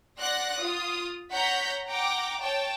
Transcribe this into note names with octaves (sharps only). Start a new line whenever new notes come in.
D5 F#5 C6 F#6 A#6
F4 D#6
C#5 F#5 A#5 G6 B6
F#5 G5 A#5 D6
C#5 G5 A5